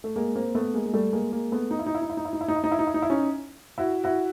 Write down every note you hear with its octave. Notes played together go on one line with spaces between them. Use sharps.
A3
G#3 A#3
A#3 C4
A3 B3
G#3 A#3
G#3
G3 A3
G#3 A#3
G#3 A#3
A3 B3
D#4
E4
D#4
E4
D#4
E4
D#4
E4
D#4
E4
D#4
E4
D#4
E4
D#4
E4
D#4
E4
C#4 D#4
E4 F#4
E4 F#4